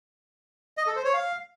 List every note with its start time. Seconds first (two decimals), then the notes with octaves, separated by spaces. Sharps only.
0.78 D#5
0.87 A4
0.96 C5
1.05 C#5
1.14 F5